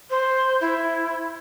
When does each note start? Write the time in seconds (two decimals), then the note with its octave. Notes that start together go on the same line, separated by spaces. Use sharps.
0.10 C5
0.61 E4